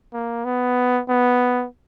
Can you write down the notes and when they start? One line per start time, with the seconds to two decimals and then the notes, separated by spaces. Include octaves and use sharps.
0.13 A#3
0.45 B3
1.09 B3